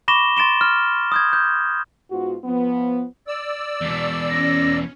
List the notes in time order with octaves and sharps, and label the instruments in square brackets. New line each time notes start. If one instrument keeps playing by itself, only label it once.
[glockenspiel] B5 C#6 D6 A#6 E7 G7
C6 A6 D7 E7 G7
F6
D#6 G6 G#6
G6
[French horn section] G#2 B3 F4 F#4
F3 B3
[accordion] D5 E6
[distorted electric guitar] E2 B2
[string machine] C#4 [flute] A#6